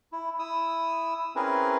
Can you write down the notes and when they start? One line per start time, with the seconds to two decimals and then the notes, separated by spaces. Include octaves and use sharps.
0.12 E4
0.39 E4 D#6 E6
1.36 C4 C#4 E4 G#4 A#4 B4